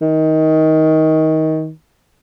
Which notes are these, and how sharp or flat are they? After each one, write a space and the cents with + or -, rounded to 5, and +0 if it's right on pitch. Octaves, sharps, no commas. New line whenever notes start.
D#3 +20